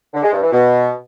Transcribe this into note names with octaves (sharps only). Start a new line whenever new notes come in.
D3
G#3
G2
E3
B2